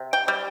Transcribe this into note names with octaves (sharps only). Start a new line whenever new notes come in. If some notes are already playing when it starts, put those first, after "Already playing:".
Already playing: C3
G5
G3